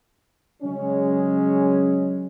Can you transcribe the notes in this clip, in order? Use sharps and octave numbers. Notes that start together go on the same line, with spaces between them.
C#3 F#3 G#3 C#4